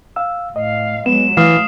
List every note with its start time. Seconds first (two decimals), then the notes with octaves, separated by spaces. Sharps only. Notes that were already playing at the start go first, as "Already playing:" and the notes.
0.16 F5 E6
0.56 A2 D#5 F5
1.06 F#3 G#3 B3 E7
1.37 E3 A3 F5 D#6 F6 C7